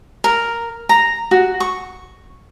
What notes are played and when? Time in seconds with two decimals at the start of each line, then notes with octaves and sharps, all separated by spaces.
0.24 A#4
0.89 A#5
1.31 F#4
1.60 C#6